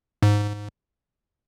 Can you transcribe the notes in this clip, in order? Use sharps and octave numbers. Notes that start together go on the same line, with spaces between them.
G#2